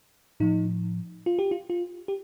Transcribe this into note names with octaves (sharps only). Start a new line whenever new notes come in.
A2 F3 D#4
F4
G4
F4
F4
G4